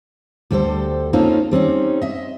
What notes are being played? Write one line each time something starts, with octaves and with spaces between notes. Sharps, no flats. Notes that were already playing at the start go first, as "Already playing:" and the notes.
D2 G3 G4 A4 C5
A#3 C4 C#4 D#4 F4 A4
G3 C4 C#4 D#4
D#5 E5